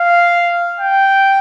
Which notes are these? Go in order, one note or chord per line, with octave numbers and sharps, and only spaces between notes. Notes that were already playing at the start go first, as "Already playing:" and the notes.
Already playing: F5
G5